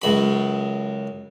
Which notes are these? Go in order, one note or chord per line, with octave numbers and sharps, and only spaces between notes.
C#2 F#2 B5